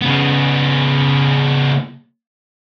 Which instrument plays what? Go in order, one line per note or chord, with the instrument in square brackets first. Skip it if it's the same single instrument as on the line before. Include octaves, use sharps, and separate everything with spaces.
[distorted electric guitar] C#3 B3